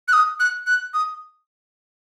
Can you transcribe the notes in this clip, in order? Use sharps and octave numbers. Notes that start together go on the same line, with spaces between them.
F#6
D#6
F#6
F#6
D#6